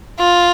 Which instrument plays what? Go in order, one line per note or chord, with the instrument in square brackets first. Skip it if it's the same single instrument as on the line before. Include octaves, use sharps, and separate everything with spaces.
[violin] F4